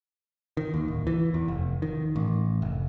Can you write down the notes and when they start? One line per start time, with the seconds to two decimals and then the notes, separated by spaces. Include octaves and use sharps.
0.57 D#3
0.74 D#2
0.88 D1
1.07 E3
1.34 E2
1.48 F1
1.82 D#3
2.16 A1
2.62 F1